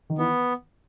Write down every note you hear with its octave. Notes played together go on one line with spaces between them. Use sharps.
D#3
E3 B3